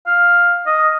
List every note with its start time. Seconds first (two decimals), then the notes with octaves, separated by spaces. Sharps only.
0.07 F5
0.66 D#5